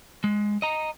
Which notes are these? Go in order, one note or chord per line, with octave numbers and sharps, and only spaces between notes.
G#3
D#5 A#5